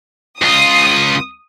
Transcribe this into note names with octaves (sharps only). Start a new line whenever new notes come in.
C#2 F4 D#6